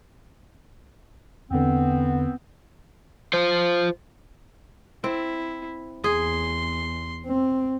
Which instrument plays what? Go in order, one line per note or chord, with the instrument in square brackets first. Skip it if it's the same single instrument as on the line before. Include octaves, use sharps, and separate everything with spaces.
[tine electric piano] E2 D3 [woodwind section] B3 C4
[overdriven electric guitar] F4 C5
[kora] C4 [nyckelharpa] E4
[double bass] E2 [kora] G#4 [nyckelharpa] C6
[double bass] C4